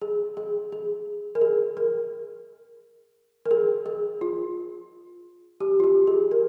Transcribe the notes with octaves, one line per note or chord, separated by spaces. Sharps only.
G#4
G#4
G#4
A#4
G#4
A#4
A#4
G#4
G#4
F4
G4
F4
G4
G#4
A#4